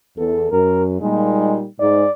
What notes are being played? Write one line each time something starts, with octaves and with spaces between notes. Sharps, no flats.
E2 A4
F#2 A#4
A#2 G3 G#3 D#4
G#2 D5